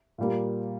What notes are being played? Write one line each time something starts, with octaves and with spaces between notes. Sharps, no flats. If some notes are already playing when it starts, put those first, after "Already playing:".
A#2 G3 A#3